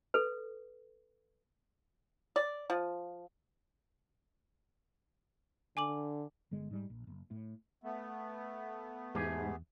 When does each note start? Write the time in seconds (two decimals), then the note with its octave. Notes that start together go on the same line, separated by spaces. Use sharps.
0.14 A4 B4
2.36 D5
2.70 F3
5.77 D3 G#5 D6 F#7
6.51 G1 D3 G#3
6.71 G#2 G3
6.90 A#1
7.07 F#1
7.31 A2
7.84 A3 B3
9.15 E2 G#2 G4 G#4 G#5